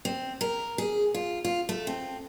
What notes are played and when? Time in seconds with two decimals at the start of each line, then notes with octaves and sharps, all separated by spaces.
0.05 C4
0.41 A#4
0.78 G#4
1.14 F4
1.45 F4
1.69 A3
1.87 C4